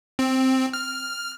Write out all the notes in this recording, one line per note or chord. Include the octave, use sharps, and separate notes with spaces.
C4
F6